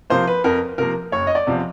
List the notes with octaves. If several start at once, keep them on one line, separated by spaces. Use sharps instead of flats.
C3 F3 A#3 C5
B4
F2 A#4
C3 F3 A#3 A#4
F#1 C#5
D#5
D5
E2 C3 F3